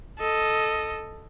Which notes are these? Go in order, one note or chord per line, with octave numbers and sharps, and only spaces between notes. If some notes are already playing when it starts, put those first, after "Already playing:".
A4 D#5